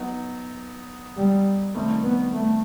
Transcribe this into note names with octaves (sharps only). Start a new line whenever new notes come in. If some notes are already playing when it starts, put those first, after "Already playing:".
Already playing: F#3 B3 D#4
G3
C3 D#3 G3 A3 C4 D#4
B3
A3